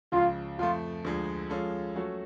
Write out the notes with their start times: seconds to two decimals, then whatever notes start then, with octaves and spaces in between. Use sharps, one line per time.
0.12 C#2 C#3 F3 F4
0.58 F2 F3 A3 F4
1.04 D2 D3 F3 G#3
1.50 F3 G#3 C#4 F4 A4
1.96 F#3 A3 C#4 F#4 A4